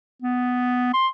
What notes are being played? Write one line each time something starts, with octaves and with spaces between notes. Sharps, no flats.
B3
C6